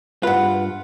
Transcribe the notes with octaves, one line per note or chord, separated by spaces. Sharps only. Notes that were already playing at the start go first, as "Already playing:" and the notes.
G2 F4 B4 F#5